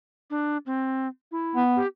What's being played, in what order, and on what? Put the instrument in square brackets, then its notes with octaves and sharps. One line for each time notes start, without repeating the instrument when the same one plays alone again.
[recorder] D4
C4
E4
[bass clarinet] B3
[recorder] G4